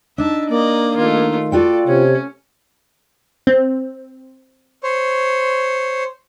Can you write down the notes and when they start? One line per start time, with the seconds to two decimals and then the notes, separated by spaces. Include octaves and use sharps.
0.18 D4 D#4 E5 A5
0.49 A#3 D5 D#5
0.97 D#3 A3 F4
1.52 F4 F#4 A4 D5 G5
1.87 C3 C#4 C#5
3.47 C4
4.83 C5 C#5